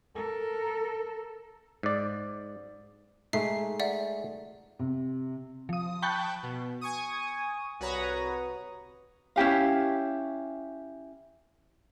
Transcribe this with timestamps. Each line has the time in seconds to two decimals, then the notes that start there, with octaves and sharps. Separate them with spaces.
0.15 A4 A#4
1.83 G#2 D5
3.33 G#3 A3 D#4 E5 C7
3.80 D5 E5 F#5
4.79 C3
5.69 F3 D#6
6.02 G5 A5 B5 C#6 F#6 G6
6.43 B2
6.81 G#5 C#6 D#6
7.80 C2 F#4 B4 C#5 A#5 D#6
9.36 C#4 E4 G4 F5